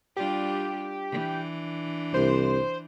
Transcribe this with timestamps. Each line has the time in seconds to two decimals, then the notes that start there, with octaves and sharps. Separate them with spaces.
0.17 G3 D4 F4 G4
1.12 E3 D4
2.14 C2 C5